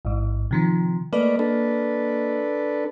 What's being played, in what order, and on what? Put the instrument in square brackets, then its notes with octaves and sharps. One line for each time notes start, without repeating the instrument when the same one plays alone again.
[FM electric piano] A1 G#2
C3 D#3 F3
[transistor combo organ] A3 B4 D5 [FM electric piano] A#3 D#5
[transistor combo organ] D4 A4 B4